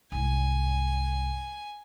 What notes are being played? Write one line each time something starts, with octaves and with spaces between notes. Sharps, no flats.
C2 G#2 G#5